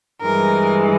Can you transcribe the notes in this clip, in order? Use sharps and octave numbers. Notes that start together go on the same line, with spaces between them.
G2 E3 G#3 A#4